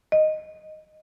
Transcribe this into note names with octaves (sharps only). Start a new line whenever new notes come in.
D#5